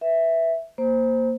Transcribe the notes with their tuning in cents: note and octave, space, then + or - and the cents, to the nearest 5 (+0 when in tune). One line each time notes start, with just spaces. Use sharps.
B4 +0 E5 +0
A#3 +0 C5 +0